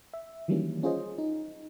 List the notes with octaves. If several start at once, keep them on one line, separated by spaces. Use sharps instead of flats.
E5
D#3 E3 F#3 G3 A#3 C#4
C#4 F4 G#4 C5 D#5
D#4